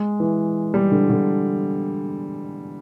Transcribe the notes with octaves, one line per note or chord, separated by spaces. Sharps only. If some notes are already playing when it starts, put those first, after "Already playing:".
Already playing: G#3
E3
G3
D3
D3